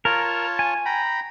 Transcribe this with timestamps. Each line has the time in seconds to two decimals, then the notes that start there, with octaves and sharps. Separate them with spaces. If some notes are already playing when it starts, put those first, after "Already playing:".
0.05 F4 A#4 C#5 A5
0.59 G#5
0.85 G5 A#5 B5